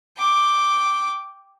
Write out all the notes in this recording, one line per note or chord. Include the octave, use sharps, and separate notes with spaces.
G5 D6